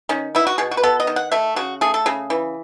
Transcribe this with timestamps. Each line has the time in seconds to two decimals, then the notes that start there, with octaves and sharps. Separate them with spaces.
0.09 D#3 C#4
0.35 B3 E4
0.47 F#4
0.58 B2 G#4
0.71 F#4
0.77 B4
0.83 B3 A4
1.00 D#5
1.07 D#3
1.16 F#5
1.32 A3 E5
1.56 C#3 F#4
1.81 A3 G#4
1.94 A4
2.06 C#3 G#4
2.30 E3